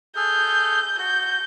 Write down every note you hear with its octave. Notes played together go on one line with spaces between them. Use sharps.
G#4 A4 F6 G6
F#4 G6